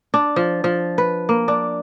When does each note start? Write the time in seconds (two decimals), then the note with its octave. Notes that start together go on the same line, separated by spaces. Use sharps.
0.14 D4
0.36 F3
0.64 F3
0.98 B4
1.29 A#3
1.48 D4